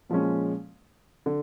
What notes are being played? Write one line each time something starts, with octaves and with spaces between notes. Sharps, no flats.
A#2 F3 G#3 C#4
D3